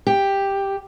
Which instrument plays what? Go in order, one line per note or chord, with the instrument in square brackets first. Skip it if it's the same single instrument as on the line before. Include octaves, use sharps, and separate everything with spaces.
[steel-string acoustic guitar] G4